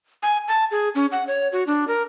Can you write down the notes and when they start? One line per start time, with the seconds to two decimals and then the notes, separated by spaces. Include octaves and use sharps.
0.23 G#5
0.48 A5
0.71 G#4
0.95 C#4
1.12 F#5
1.27 C#5
1.53 F#4
1.67 D4
1.88 A#4